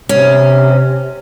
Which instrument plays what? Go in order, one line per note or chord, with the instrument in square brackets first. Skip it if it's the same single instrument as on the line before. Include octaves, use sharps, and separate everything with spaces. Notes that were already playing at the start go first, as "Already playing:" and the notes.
[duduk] C3 [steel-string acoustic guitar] C#4